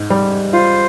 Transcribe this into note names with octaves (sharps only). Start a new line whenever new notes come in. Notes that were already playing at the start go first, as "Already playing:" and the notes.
Already playing: G#2
G3
F4 C5